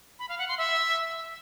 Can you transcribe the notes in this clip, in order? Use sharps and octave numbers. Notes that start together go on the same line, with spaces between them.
B5
F5
F#5
C6
E5